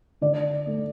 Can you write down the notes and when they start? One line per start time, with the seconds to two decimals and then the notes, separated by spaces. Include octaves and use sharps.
0.21 D3 D5
0.67 A3